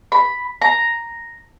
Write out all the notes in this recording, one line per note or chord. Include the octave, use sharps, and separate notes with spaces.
B5
A#5